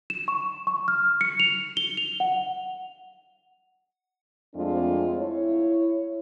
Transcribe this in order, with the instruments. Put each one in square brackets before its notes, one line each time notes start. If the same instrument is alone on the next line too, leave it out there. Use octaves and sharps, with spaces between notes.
[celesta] E7
C#6
C#6
F6
C#7
F7
G7
F7
F#5
[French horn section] F2 G#3 A3 C4 D4 F4
E4 C#5